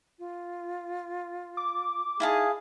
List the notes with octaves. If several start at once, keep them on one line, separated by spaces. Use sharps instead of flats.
F4
D6
D#4 E4 G#4 F5 A5